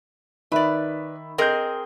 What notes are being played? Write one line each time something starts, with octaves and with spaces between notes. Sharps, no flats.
D#3 B4 D5 E5 B5
C4 G#4 A#4 D#5 G6